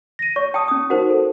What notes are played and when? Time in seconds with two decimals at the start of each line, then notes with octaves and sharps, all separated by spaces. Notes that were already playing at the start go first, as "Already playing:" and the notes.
0.19 A#6 D#7
0.36 C#5 C#6
0.54 G5 A5 D#6
0.68 C#4 D#6
0.90 D#4 F#4 A#4 C5 F#5
1.10 A4